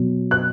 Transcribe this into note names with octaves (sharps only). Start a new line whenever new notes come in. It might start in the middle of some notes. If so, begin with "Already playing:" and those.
Already playing: B2 F#3
F#6